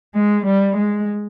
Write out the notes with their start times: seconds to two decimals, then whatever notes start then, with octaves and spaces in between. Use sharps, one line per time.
0.15 G#3
0.46 G3
0.76 G#3